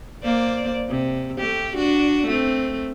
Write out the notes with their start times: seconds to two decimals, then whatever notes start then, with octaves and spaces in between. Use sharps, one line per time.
0.23 A#3 C5 D5
0.89 C3
1.38 A3 G4
1.75 D4 F#4
2.27 A3 C4